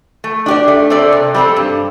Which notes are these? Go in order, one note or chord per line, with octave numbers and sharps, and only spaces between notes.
A3
D4 G4 D5
A3
C4 A4 D5
C3
G3 C4 A4
G2